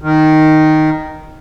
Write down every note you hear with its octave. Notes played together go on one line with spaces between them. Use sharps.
D#3